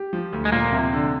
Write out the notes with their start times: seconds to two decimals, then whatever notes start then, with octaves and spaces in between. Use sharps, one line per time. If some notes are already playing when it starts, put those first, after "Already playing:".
Already playing: G4
0.13 F3
0.33 D2
0.45 G#3
0.52 A#2 F3 A#3
0.73 C3
0.93 D3